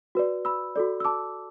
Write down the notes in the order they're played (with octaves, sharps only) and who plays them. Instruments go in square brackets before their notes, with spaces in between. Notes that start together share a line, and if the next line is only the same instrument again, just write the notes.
[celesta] F#4 B4 D5
B5 E6
F#4 A4 D5
E6
A5 D6